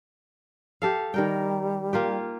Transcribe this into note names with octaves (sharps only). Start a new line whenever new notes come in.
G4 A4 F5
D#3 G3 A#4 G5
A#3 F4 G4